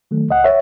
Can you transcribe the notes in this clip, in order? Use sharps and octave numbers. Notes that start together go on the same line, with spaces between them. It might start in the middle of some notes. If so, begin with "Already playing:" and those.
D#3 F#3 A3
C#2 D#5 F#5
C#5 E5